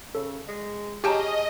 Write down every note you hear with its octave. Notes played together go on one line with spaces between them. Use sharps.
C#3 A4
G#3
C#4 G4 G#4 D#5 G5 A5 A#5